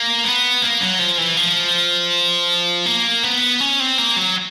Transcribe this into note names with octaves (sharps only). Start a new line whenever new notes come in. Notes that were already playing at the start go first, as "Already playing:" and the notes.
Already playing: A#3
B3
A#3
F#3
F3
E3
F3
A#3
B3
C#4
C4
A#3
F#3